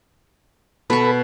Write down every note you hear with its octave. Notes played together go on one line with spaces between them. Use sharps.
B2 A4 B4 B5 C#6